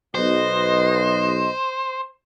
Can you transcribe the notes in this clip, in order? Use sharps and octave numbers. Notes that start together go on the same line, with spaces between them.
B1 B3 B4 C5 D#5